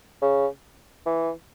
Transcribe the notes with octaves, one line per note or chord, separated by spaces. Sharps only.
C#3
E3